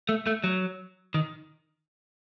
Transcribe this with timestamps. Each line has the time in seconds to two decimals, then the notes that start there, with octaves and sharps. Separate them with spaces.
0.09 A3
0.27 A3
0.44 F#3
1.14 D#3